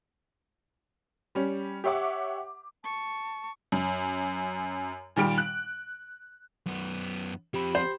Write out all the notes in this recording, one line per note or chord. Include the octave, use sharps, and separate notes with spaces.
G3 C#4
G4 C#5 E5 F#5 D6
A5 C#6
F#2
A#2 D#3 G3 D7
F#6
F#2 B3
F3 C4 G4 B5
C5